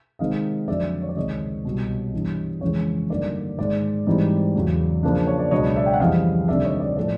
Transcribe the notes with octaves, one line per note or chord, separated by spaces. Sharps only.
C3 D#3 G#3 C4 D#4 D#5 F5
F2 D3 F#3 D5 E5
C#5
D5
C#2 C3 D#3 C#5 D#5
C2 B2 G3
G2 E3 G3 B3
F2 C#3 E3 G#3 C#4 C#5
G2 D3 F#3 A#3 D#4 D5
G#2 D#3 G#3 D5
G#2 E3 G3 C4 D#4
E2 C#3 F#3
C#3 F3 A#3 D4
C#5
D5
C#2 B2 F#3 B3 D4 C#5 D#5
D5 E5
G5
F#5
F2 C#3 E3 G3 D#5 F5
D2 C3 D#3 G3 D5 E5
C#5 D#5
D5
A2 F3 A3 D5